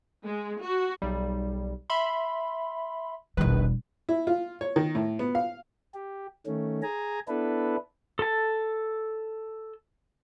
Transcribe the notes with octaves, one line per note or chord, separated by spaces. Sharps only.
G#3
F#4
B1 G3
E5 B5 C6
E1 A#1 D#3 G3 B4
E4
F4
C#5
D#3
A2
B3
F5
G4
D#3 A3 C#4
G#4 G#5 A#5
B3 D4 E4 A4 B4
A4 A5